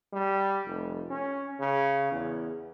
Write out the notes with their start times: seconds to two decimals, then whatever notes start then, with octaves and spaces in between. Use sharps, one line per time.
0.13 G3
0.66 F1
1.10 C#4
1.60 C#3
2.12 E2